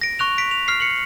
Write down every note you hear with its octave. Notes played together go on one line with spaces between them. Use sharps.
A#6 D7
C#6 F#6 F7
B6 D7
F7
F6 C7
C#7 F#7